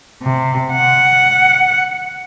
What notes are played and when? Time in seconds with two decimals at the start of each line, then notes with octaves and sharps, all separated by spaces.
0.23 C3
0.74 F#5